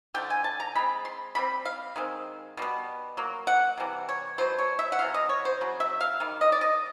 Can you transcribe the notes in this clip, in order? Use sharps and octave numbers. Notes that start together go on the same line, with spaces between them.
D3 F3 A3 G5
G#5
A5
A#5
B2 G#3 C4 B5
C6
B2 G3 C4 B5
F5
D#3 G#3 C4
B2 G3 B3
F#3 A#3
F#5
C3 E3 G3
C#5
B2 F#3 C5
C#5
E5
F#5
C3 E3 F5
D#5
C#5
C5
C#3 F#3
E5
F5
D#3 G3
D#5
D5
D#5